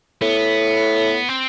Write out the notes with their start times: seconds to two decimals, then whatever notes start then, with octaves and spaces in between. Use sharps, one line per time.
0.22 A2 B3
1.29 C4